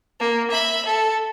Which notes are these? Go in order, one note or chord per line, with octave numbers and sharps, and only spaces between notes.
A#3
E5 B5
A4